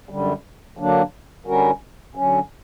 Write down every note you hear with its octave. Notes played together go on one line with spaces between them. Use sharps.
F#2 D3 G3
D3 F#3 A#3 D4
D3 G3 C#4 F#4 A#4
D3 F#3 C#4